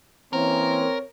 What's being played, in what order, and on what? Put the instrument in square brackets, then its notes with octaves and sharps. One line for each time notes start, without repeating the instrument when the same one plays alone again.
[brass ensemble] E3 A#3 C#4 [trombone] C4 [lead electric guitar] A#4 [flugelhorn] C#5